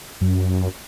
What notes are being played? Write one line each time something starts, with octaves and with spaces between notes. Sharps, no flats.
F#2